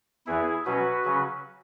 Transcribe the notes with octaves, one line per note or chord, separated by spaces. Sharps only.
E2 E3 B3 E4 G#4
B2 F#3 C#4 F#4 B4
C#3 F#3 C#4